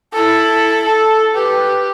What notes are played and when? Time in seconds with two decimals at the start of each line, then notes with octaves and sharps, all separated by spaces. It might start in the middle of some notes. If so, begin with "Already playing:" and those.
0.13 E4 A4 A5
0.85 A4
1.35 G4 B4